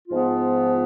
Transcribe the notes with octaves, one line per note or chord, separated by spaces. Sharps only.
G#2 F3 B3 F4